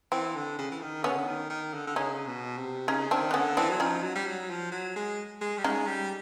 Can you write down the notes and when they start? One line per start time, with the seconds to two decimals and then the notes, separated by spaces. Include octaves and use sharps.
0.12 E3 C4
0.36 D3
0.59 C#3
0.71 E3
0.81 D#3
1.04 D3 B3 C#4
1.11 C#3
1.18 D3
1.27 D#3
1.50 D#3
1.74 D3
1.87 D3
1.96 C#3 C#4 D#4
2.27 B2
2.57 C3
2.88 C#3 C#4 D#4
3.11 D#3 C4 D4
3.31 D4
3.34 D3 B3 C#4
3.57 E3 C4 D4
3.70 F#3
3.80 F3 C#4 D#4
4.03 F#3
4.16 G3
4.26 F#3
4.50 F3
4.72 F#3
4.96 G#3
5.41 G#3
5.58 G3
5.64 G#3 C#4 D#4
5.87 G3